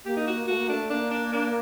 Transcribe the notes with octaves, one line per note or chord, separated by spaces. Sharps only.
A#3 G4
D#4
F#4
A3 F#4
A#3
A3 D4
A#3 D4
D4
D4